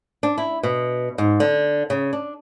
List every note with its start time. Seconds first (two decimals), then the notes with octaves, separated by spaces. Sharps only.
0.23 D4
0.38 E4
0.63 B2
1.18 G#2
1.40 D3
1.90 C#3
2.13 D4